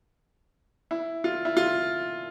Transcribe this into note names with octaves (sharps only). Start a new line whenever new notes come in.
E4
F4
E4
F4